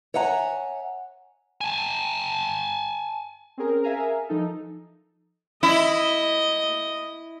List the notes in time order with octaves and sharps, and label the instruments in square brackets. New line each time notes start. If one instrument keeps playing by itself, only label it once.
[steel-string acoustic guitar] C#5 E5 F#5 G#5 A#5
[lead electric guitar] G#5 A5
[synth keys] C4 C#4 G#4 A#4
G#4 A#4 E5 F5 G#5 A#5
F3 D#4 A4
[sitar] E4 [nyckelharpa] D#5